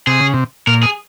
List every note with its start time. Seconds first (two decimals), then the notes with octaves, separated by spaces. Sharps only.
0.07 C3 G#4
0.20 C#3
0.34 C3
0.67 A#2 A#4
0.83 G#4